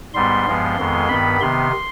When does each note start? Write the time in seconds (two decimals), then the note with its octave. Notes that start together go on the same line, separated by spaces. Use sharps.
0.14 G#2 G3 B3 C6
0.45 G2 F3 G#3 B3
0.77 F2 D#3 G#3 B3
1.08 G2 D#3 B3 B5
1.40 C3 D#3 B3 C6